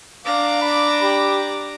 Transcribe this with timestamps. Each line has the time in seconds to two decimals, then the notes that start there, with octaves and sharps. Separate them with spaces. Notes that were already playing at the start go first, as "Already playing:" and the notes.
0.24 D4 F5 A#5 D6
0.62 B5
1.02 G4